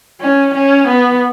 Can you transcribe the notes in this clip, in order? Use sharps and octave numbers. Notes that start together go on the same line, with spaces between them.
C#4
C#4
B3